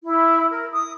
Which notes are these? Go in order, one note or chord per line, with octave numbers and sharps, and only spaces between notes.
E4
A#4
D#6